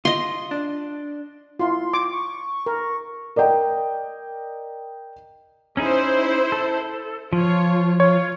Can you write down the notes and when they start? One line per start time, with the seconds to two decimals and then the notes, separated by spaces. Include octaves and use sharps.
0.05 F4 D#5 C6
0.51 D4
1.59 E4 F4 C6
1.94 D6
2.12 C#6
2.66 A#4
3.36 A#4 D5 D#5 G5
5.77 C#4 D#4 E4 G#4 C5
6.52 A4
7.33 F3 F4 C#5
8.00 F4 C#5